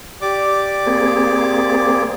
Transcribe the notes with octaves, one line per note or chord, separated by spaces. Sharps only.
G4 D5 D6
A#3 C4 G#4